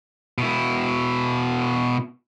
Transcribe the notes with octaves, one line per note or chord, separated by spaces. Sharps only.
B2 E4